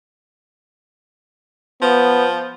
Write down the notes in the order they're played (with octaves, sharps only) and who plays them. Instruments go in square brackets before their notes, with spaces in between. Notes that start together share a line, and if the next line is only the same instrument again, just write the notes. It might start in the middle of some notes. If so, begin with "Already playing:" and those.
[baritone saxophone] F3 [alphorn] B3